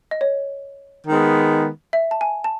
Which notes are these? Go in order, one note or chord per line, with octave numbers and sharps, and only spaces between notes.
D#5
C#5
D#3 G#3 B3
E5
A5
G#5
A5